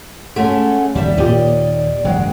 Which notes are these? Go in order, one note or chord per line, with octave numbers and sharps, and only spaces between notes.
G#3 A3 C#4 F#5
D#2 G3 D5 E5
D#2 A#2 A#3 G4 D#5
F#1 E2 G#2 F#3 G#3 F#5 G5